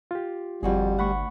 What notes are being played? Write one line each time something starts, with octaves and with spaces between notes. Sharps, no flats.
F4 G4
G1 F2 G3 F#4 G#4
D2 F#5 B5 C#6